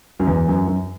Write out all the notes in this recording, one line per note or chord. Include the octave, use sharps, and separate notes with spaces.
F#2
E2
F#2
F#2